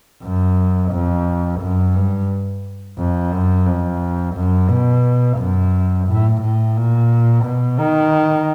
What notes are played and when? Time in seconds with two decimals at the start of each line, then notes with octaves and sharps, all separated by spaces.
0.23 F#2
0.93 F2
1.61 F#2
1.95 G2
2.98 F2
3.32 F#2
3.67 F2
4.36 F#2
4.70 B2
5.38 F#2
6.08 A2
6.42 A2
6.77 A#2
7.45 B2
7.79 D#3